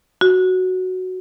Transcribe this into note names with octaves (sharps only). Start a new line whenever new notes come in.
F#4